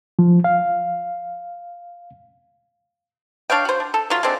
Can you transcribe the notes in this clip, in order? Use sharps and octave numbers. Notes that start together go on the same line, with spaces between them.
F3
F5
D4 C#5 F5 G5
F#4 C5
D4
A4
F#3 F4
G#3 A3 C4 D4